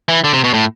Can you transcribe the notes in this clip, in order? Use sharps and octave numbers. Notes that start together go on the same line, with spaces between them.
E3
D3
C3
B2
A2